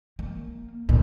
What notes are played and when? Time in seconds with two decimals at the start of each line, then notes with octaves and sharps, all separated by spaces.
0.19 A#3
0.89 D2 A#2